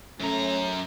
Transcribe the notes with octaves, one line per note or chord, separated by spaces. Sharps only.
F#2 A3 C#4 A#5